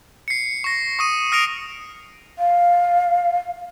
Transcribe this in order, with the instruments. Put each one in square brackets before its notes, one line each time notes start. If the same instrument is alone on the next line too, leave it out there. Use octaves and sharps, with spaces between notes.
[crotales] C7 C#7
C#6 A#6
C#6 D#6 D#7
D#6 F6 A#6 C#7 D7 F7
[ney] F5